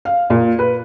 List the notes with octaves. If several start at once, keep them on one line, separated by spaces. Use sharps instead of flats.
F5
A#2
B4